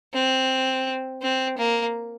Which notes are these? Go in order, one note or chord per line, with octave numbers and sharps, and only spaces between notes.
C4
C4
A#3